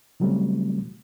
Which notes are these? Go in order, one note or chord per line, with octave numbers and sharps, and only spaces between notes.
C#3 E3 F#3 G3 A3 C4